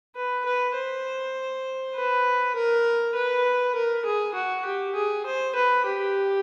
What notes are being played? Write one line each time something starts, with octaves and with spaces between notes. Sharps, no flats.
B4
B4
C5
B4
A#4
B4
A#4
G#4
F#4
G4
G#4
C5
B4
G4